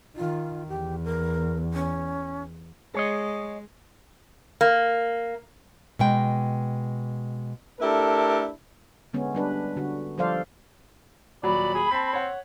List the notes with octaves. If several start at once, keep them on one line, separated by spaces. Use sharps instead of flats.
D#3 F4
E2 G4
A#4
C#4
G#3 G#4 C#5 D#5
A#3
B2 G#3 G5
A3 D4 E4 G4 A4 A#4
D3 G#3 B3 C#4
G3 D4 B4
D3 F#4
F3 G3 A4 C5 D5 F5
D#1 F#3 D5 B5
G#4
C4 A5 B6
C#5 F#5